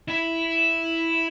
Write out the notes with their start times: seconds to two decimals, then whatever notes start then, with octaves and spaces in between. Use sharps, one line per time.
0.08 E4 E5